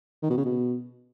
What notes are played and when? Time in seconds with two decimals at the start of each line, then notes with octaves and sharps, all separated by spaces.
0.23 D#3
0.30 B2
0.38 C#3
0.45 B2